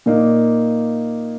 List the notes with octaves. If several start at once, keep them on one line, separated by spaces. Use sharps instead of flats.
A#2 A#3 D#4